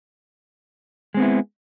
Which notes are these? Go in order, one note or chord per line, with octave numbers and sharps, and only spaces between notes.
G#3 B3 C4 E4